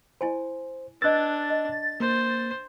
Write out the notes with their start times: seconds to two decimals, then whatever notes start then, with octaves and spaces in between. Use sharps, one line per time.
0.21 E4 C5 G#5 A5
1.02 D4 B4 D#5 E6 F#6 G#6 A6
1.50 D#5
2.00 A#3 C5